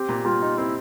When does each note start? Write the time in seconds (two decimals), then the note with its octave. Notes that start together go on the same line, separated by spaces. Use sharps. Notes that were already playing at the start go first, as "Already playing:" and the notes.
Already playing: C4 G4
0.09 A#2
0.25 G3 F4
0.42 D#4
0.58 C4 E4